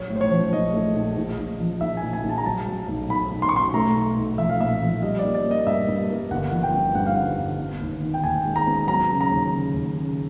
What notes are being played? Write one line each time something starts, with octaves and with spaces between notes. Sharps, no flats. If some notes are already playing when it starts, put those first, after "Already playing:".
Already playing: A#1 F#3 C#5
A2
C5
C#5
F3
A#1 D#5
A3
A#1
A#1
A#1
F3
A#1 E5
G#5
A#1
G#5
A#1
A5
A#5
F#3 A5
F#3
B1
B1 B5
B1
C6
C#6
B2 C6
A3 A#5
B1
B1
F3 E5
F5
A#2 E5
F3
G3 D#5
D5
A#3
D5
A#3
D#5
G2 E5
G2
A#3
G1 F#5
F3
G5
G2
G2 F#5
F5
D3 F#5
G1
B3
D#2
D#3
G5
D#2 G#5
G#3
A#5
B3
F#3 A#5
C#3
A#5
D#2
C#3
D#2
C#3